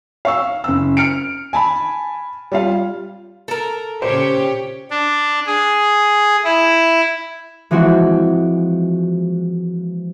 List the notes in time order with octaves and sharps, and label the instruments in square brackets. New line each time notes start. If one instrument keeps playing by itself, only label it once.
[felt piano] F5 C#6 E6
F#1 E6
F6 C#7 D7
G#5 A5 B5
G3 F4 F5
[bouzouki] A4 A#4
[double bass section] A#2 C#3 C#4 [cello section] G4 C#5 [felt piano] C5
[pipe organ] D4
G#4
E4
[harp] E3 F3 G#3 C4 F#4